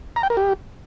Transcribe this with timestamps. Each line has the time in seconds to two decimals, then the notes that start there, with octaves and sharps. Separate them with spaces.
0.16 A#5
0.23 G5
0.30 A#4
0.37 G4